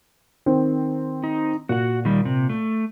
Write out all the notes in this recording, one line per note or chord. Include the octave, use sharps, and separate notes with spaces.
D#3 C4
D#4
A#2 F#4 F#5
D#3 G3
C3
A3